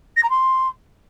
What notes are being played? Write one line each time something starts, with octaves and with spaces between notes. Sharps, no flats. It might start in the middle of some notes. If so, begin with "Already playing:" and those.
A#6
A#5
C6